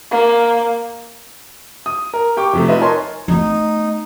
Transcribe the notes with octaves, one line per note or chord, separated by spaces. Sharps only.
A#3
D#6
A#4
G4 G5 C#6 D6
F2 C3 A3
D#4 F4 B4 D#5 E5
A#4 C#5 D#5 G#5 A5 C6
A3 B3 D#4